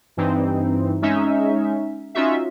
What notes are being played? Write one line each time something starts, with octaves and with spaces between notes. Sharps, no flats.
G2 E3 C4 D#4
G#3 C#4 D#4 E5
C#4 D#4 F4 F#4 E5